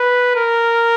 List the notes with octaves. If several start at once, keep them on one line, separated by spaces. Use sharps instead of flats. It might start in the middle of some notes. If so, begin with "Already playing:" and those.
Already playing: B4
A#4